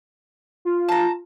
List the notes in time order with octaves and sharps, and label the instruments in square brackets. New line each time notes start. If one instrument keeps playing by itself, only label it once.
[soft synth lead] F4
[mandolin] A5 A#5